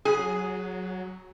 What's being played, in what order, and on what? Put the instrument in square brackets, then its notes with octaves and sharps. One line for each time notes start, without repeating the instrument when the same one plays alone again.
[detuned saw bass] F#3 [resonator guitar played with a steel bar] G#4